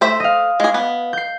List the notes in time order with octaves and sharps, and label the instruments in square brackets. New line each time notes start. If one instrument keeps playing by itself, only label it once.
[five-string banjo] A3 C5 E5
[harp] D#5 F5
[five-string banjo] G#3 G#4
B3
[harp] G6 C7